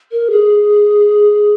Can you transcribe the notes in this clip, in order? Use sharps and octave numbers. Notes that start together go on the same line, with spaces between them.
A#4
G#4